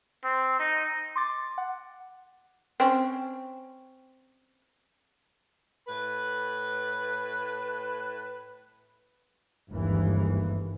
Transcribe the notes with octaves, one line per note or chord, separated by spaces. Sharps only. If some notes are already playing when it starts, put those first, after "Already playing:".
C4
D#4
C6 D6 A6
F#5
C4 C#4
A2 B4
G1 D#2 G#2 E3